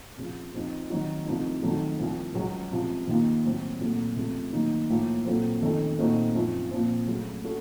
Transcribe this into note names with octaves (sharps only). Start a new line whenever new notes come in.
F2 C#3 F3
F2 C#3 F3 C4 D#4
D#3 F#3 C4 D#4 F#4
C2 C3 F3 A3 D#4
F2 D#3 F#3 A3
C2 C3 F3
C#2 C#3 F#3
C#2 C3 F3
D#2 D#3 A#3 F4
A2 F#3 C4
C2 A#2 F#3 A3
C#2 C3 F3 A3
D#3 F#3 A#3 D#4
A2 F3 A#3 F4
A#2 F#3 C4 F4 A4
F2 D#3 A3 C#4 A4
A#2 A3 C4 D#4 F#4
F#2 F3 C4 F4
A#2 F3 C4
C#3 F#3 A3
C#4 F#4 A4